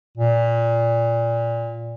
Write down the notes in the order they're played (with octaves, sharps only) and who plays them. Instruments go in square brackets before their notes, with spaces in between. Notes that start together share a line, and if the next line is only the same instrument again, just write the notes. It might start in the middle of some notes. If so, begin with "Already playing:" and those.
[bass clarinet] A#2